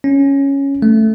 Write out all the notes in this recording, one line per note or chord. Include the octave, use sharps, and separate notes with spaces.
C#4
A3